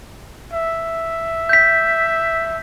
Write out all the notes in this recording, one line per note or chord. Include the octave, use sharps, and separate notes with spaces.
E5
G6 B6